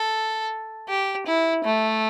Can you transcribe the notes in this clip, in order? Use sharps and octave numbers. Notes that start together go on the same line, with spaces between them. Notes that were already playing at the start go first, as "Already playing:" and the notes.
Already playing: A4
G4
E4
A3